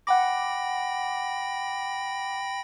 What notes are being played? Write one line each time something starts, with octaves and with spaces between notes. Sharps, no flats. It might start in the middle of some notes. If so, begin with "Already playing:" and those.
F#5 G5 B5 D6 A#6